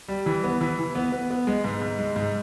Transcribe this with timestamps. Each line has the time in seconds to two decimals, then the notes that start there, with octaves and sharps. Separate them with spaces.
0.08 G3
0.26 E3
0.44 B3
0.61 E3
0.79 E3
0.95 B3
1.12 B3
1.30 B3
1.47 G#3
1.64 G#2
1.82 G#2
1.98 G#3
2.16 G#2